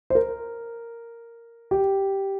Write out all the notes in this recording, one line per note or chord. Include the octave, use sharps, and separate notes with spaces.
C5
A#4
G4